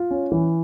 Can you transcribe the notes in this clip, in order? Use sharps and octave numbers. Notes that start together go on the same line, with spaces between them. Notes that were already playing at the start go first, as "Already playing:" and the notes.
Already playing: F4
C#4
E3